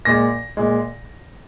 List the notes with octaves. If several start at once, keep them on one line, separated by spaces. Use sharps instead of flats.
A#2 G#3 A#6
A#2 G#3